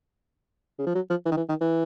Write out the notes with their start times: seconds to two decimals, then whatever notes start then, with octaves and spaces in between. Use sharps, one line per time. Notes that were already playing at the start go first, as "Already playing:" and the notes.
0.79 C#3
0.87 F3
0.95 F#3
1.10 F3
1.25 E3
1.32 D#3
1.37 E3
1.49 D#3
1.61 E3